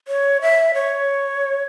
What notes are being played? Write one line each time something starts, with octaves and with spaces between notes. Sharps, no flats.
C#5
E5
C#5